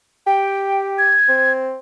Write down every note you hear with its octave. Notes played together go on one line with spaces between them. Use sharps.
G4 G5
G#6
C4